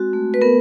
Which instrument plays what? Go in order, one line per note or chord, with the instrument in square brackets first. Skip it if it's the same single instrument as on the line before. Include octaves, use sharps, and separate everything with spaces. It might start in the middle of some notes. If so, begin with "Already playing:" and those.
Already playing: [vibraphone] G#3 C4 F#4
A3
B4
B3 A#4